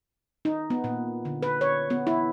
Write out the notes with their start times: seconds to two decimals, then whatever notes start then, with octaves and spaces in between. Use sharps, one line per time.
0.45 D#4
0.70 B3
0.84 A#2
1.25 D3
1.42 B4
1.61 C#5
1.90 B3
2.07 E4